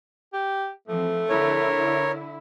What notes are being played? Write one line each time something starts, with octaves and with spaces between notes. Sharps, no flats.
G4
E3 F3 A3 C4
D3 E4 A#4 C#5